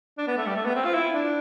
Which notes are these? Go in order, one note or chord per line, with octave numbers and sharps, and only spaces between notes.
D4
B3
A3
G3
A3
B3
C4
F4
E4
D4